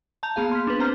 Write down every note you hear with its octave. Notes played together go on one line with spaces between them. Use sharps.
A5 A#5 G6 F7
A#3 B3 G#4 F5
C6 F6 B6
D4 B4
C4 C5 A#5 F6